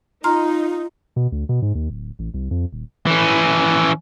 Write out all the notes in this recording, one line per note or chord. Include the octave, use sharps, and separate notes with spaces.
D#4 F4 A#5 C6 F6
B2
D2
B2
G#2
D#2
D1
A1
C2
F2
D#1
E3 C#4